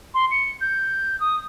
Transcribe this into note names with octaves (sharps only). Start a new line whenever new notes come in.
C6
C#7
G6
D#6